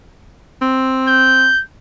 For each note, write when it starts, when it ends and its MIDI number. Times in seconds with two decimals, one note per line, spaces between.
0.62 1.50 60
1.08 1.62 91